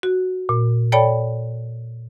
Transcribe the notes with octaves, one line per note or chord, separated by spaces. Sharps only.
F#4
A#2
A4 C#5 D5 G5 A5 B5